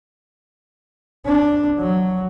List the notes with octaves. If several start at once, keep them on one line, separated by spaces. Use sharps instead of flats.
D4
F#3